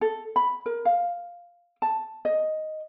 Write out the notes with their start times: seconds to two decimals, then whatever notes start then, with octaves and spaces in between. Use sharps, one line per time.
0.01 A4
0.36 B5
0.66 A#4
0.85 F5
1.82 A5
2.25 D#5